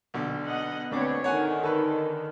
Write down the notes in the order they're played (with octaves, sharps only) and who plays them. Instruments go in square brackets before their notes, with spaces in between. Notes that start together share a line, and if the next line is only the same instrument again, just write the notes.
[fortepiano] B1 D3
[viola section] B3 D#5 F#5
[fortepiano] D2 D4 D6 [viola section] C4 B4 C#5
[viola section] D3 D#3 [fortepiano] C#5 F#5 G#5
[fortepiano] A4 B4